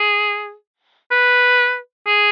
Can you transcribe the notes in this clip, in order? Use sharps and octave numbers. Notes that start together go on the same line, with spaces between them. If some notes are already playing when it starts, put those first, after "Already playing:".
Already playing: G#4
B4
G#4